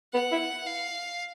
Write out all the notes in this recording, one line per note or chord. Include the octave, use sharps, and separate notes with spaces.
B3 F#5
E4
F5